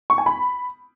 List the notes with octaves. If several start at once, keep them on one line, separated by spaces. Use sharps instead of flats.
C#6
G#5
B5